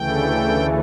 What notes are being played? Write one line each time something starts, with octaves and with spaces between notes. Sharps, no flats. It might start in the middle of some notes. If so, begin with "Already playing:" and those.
Already playing: D2 C#3 E3 A3 G5